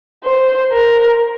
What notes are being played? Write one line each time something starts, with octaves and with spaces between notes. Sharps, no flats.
C5
A#4